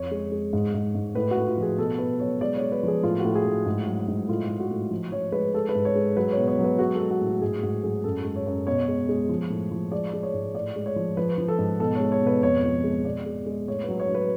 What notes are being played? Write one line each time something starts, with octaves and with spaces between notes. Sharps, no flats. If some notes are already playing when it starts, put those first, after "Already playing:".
Already playing: F2 C#5
G#3
G#3
G#2
G#2
G#2
A2 B4
F#4
A2
F4
F3 G#4
B2 A4
B2 B4
F#3 C#5
G#3 D5
C#5
G#3
B4
F3 G#4
A2 F4
F#4
A2
G#4
A2
G#2
F#3
G#2
A2 F4
A2
F#4
A2
F3
F3 C#5
G#3 B4
G#3 A4
B4
G#2
C#5
G#3
F#3 B4
C#5
B2
C#5
F#3
B4
G#3 F#4
A4
G#3
F#4
A2
F#4
G#2 G#4
G#2 F#4
F#3 G#4
F#2 A4
G#3
C#5
F#2
B2 C#5
G#3
G#3
F3
A2
F3
G#3 D5
G#3
C#5
G#2
A2 D5
G#3
C#5
F3
F3 B4
F3
A4
G#2
B2 A4
G#3 C#5
C#5
B2 B4
F2 C#5
F3
G#3
B2 D5
G#3
G#3
A2 C#5
F#3 B4
C#5
F#3
B4